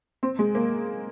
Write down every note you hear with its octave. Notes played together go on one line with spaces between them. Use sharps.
C4
G#3
A#3